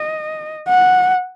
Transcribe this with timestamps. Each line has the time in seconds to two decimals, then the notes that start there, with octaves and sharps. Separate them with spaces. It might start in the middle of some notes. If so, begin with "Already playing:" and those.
Already playing: D#5
0.69 F#5